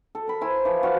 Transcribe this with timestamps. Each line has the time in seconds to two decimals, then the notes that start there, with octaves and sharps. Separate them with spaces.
0.15 A4
0.27 A#4 B5
0.41 E4 C5 G#5
0.65 E3 F3
0.83 F#4 D5 F5